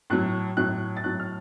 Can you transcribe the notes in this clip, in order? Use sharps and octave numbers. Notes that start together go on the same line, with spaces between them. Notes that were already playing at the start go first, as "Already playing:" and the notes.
A2 F#3 F#6
A2 F#3 F#6
A6
A2 F#3 F#6
F6